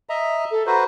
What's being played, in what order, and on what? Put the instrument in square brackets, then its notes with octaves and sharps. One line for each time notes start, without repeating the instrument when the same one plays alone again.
[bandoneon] D#5 E5 A#5
[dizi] A4
[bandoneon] F#4 B4 C5 [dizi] A#5